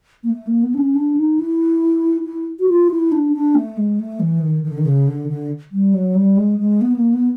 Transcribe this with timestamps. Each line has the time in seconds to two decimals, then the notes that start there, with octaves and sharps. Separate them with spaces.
0.24 A#3
0.30 A3
0.47 A#3
0.63 B3
0.74 D4
0.79 C#4
0.95 D4
1.17 D#4
1.39 E4
2.25 E4
2.59 F#4
2.69 F4
2.91 E4
3.12 D4
3.33 D4
3.55 A3
3.77 G#3
3.99 A3
4.20 E3
4.42 D#3
4.64 D#3
4.70 D3
4.78 D#3
4.85 C#3
5.08 D3
5.29 D3
5.72 G3
5.94 F#3
6.15 G3
6.37 G#3
6.59 G#3
6.81 B3
6.96 A#3
7.13 B3